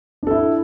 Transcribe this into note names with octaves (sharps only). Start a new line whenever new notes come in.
D4 E4 A4